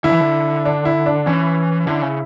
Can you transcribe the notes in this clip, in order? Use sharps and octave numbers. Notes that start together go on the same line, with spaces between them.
D3 E4
E3
D3
D4
E4
D4
E3 C#4
D3 E4
C#3